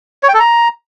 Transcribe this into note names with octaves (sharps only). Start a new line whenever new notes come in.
C#5
G5
A4
A#5